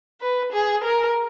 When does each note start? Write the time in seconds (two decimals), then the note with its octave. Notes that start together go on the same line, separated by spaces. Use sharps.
0.21 B4
0.53 G#4
0.84 A#4